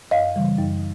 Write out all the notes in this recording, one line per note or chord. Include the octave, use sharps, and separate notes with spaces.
F#2 D#5 F5
C#3 E3 G3
F#2